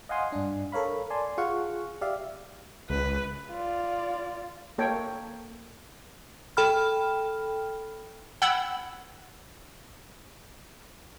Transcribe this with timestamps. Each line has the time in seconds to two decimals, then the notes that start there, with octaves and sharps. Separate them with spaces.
0.09 D#5 F5 F#5 G#5 C6 D#6
0.32 G2 D4
0.72 A4 A#4 C#5 F5 B5
1.10 D5 G#5 A5 C6
1.38 F4 G#4 F5 F#5 C#6
2.01 G4 D5 E5 F5
2.90 C#2 B4
3.50 F4 D5
4.78 A#3 A4 C#5 G5
6.57 A4 G5 B5 F6
8.42 F#5 G5 B5 E6 G#6